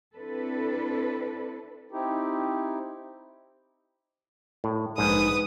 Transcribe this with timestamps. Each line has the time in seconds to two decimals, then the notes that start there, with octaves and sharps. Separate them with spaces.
0.15 C4 D4 E4 A4 B4
1.92 C4 D#4 E4 G4
4.64 A2
4.98 A#1 G#2 B4 D#6